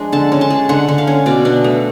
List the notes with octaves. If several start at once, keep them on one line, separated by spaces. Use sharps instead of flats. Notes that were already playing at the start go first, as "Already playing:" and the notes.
Already playing: F3 G#3 D4
D3 A5
C#4
A5
G#3
D3 F#5
D3
F5
C#4
B2 D5
D4
A3